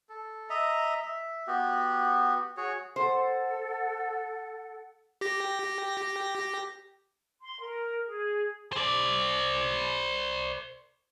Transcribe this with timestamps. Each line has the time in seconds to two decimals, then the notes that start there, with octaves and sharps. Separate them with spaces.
0.09 A4
0.50 D#5 E5 A#5
1.02 E5
1.47 B3 F#4 G4
2.57 F#4 G#4 C#5
2.96 A4 C5 F#5
5.21 G4 A#6
7.41 C6
7.61 A#4
8.05 G#4
8.73 C5 D5